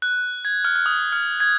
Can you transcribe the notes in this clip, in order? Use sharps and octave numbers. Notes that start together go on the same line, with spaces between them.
F#6
G#6
F6
F6
D#6
F6
G#6